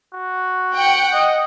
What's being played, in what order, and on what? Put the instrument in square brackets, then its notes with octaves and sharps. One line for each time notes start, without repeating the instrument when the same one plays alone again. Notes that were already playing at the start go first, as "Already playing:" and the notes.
[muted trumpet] F#4
[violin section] F#5 G5
[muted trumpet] D#5